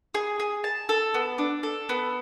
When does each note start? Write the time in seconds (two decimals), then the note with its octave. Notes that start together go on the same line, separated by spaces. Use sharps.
0.14 G#4
0.39 G#4
0.64 A5
0.89 A4
1.14 B3
1.38 D4
1.63 A4
1.89 B3